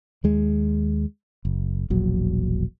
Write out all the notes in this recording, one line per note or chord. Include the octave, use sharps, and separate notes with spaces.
D#2 G#3
F#1
E1 A#1 F#3